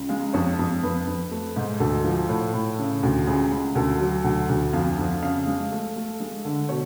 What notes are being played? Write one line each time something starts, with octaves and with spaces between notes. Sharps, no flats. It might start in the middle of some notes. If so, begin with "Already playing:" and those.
Already playing: C#2
G#3 F5
F2 C#5
F2
F2 B4
F2
A3
G#2
D2 A4
F3
A2
A2
C#3
D2
C#2 G#4
C#2
D2 A4
F#3
D2
D2
F2 F5
F2
C#3 F5
G#3
A3
A3
G#3
D3
B2 C#5